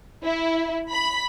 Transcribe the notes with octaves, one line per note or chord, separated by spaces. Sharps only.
E4
B5